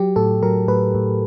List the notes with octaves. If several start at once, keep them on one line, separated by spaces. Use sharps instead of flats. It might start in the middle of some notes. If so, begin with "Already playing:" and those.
Already playing: F#3 G4
A2 A4
F#3 A#4
A2 B4
A2